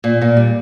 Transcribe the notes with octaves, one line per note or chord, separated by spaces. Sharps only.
A#2
A#2
G3